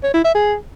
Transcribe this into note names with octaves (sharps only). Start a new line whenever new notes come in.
C#5
E4
E5
G#4